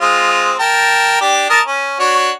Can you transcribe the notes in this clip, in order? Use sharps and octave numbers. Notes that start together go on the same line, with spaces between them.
G#3 C4 F4
A#4 G5 A5
D4 G4
A#4 D#5 A5
C#4
D4 F#4 C#5